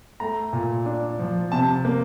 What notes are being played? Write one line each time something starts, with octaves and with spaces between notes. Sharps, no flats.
A3 A#5
A#2
D4
F3
C3 A5
A#3